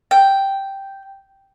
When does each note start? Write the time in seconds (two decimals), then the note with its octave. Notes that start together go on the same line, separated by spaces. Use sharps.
0.11 G5